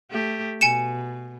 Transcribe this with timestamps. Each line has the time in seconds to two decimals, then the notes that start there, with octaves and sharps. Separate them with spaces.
0.11 A3 G4
0.61 B2 G#5 C#7 E7